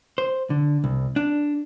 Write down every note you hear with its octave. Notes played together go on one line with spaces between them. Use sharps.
C5
D3
C2
D4